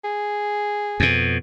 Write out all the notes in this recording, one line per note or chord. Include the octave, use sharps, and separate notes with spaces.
G#4
F2 B2